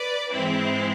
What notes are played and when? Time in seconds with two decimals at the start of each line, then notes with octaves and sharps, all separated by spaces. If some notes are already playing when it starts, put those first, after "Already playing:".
Already playing: B4 D5
0.32 G#2 E3 G#3 C4 E4